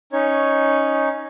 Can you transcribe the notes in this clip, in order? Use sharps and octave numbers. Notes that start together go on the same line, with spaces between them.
C#4 D#4 C#5